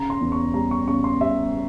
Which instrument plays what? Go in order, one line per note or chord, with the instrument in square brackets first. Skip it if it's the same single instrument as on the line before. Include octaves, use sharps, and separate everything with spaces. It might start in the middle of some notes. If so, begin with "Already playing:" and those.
Already playing: [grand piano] C#3 A#5
C6
E2
C#6
G3 A#5
C#6
C#3 C#6
C6
G3 E5